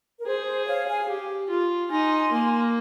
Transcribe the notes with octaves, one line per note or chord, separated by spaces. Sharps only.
A#4
G#4 C5
C5
C#5 F5
F5 G#5
G4
F4
D#4 G#5 C6
A#3